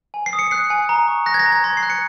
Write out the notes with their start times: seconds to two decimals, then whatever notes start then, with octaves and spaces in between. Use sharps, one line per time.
0.14 G#5
0.26 C7
0.33 D#6
0.39 C#7
0.51 F#6 C7
0.70 G#5
0.89 A#5
1.08 C#6
1.26 F#6 A#6
1.34 G#6
1.39 A#6
1.46 A#5
1.52 G#6
1.64 C6 A#6
1.77 C7
1.83 F#6
1.90 C#7